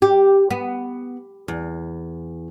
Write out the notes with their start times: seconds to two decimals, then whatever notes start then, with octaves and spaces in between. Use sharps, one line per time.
0.02 G4
0.51 B3
1.48 E2